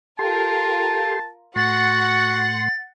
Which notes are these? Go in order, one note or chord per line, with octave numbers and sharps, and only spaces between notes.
F4 G4 A4 A#4 A5 C6
A2 F#4 F#5 C6 A6